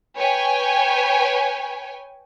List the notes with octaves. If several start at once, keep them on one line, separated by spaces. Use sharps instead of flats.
B4 C#5 G5 G#5